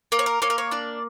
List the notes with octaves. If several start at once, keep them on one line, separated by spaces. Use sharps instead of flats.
A#3 A#4
C#5
A#4
A#3 C#5
A#4
C#5
D4 D5